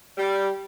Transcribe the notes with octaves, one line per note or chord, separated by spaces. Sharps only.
G3